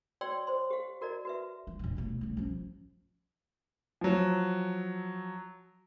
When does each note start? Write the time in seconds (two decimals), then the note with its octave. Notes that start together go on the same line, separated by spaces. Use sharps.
0.21 F#4 C#5 D5 G5 C6 E6
0.47 C5 C6
0.70 G4 F5
1.01 F#4 A#4 D5 D#5 A#5
1.25 F#4 B4 E5
1.67 F3
1.79 F1 A#1
1.97 B1 A3
2.21 C#3 A3
2.37 F3 C#4
4.01 F3 F#3